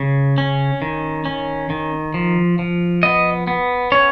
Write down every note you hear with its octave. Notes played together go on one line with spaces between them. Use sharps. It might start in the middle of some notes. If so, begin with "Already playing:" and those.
Already playing: C#3
C#4
D#3
C#4
D#3
F3
F3
B3 D#5
B3
C#4 C#5